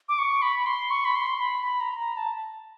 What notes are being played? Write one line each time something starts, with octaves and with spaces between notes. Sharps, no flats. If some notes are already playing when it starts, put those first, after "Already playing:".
D6
C#6
B5
C6
C#6
B5
C6
B5
B5
A#5
A#5
A5